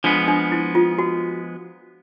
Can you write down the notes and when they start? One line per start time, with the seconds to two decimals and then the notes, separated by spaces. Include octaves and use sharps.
0.04 F3 G#3 B3 D4
0.28 D4
0.52 E4
0.75 F4
0.98 F#4